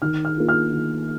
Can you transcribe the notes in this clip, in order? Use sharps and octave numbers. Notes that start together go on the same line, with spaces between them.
D#3 F6
F6
A#3 F4
F6
D#3